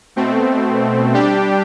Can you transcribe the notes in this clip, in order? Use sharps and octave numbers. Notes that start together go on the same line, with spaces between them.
B2 A3 C4
G3 D4 G4